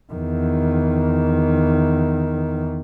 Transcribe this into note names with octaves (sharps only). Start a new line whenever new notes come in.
E2 D#3